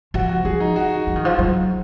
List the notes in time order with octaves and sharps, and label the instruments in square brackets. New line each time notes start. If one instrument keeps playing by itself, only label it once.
[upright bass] F3 [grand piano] F#4
[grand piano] F#4
[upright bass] F3 [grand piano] G#4
[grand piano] D#4
F#4
[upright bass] F3
D#3
F3
F#3